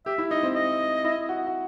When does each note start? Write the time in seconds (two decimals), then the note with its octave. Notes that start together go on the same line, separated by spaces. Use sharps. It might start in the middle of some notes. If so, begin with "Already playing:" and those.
0.06 G4 E5
0.18 E4
0.31 D#4 D#5
0.43 C4
0.55 D#5
1.04 E4
1.29 F#4
1.47 F#4